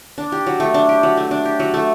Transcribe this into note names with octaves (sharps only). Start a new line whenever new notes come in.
D4
G4
F#3
A3
D4
G4
F#3
A3
D4
G4
F#3
A3